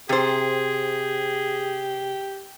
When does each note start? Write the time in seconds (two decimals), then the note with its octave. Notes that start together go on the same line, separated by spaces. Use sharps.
0.09 C3 G4 G#4 C5